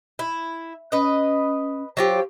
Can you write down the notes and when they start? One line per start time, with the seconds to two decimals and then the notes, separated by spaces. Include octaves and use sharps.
0.19 E4
0.92 C#4 B4 D#5
1.97 F#3 F4 G4 C5